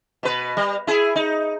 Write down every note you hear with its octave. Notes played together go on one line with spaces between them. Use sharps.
B2 B4
G3
E4 G#4
D#4